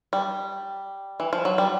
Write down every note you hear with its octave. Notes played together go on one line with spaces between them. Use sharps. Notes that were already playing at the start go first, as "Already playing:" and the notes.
G3
E3
F3
F#3
G3